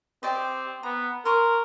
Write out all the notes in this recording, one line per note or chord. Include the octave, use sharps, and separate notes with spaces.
C4 G4 D5 D#5
B3 A#5
A#4 C6 C#6 D#6